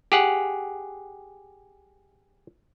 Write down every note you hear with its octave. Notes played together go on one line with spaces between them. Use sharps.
G4 G#4 F#5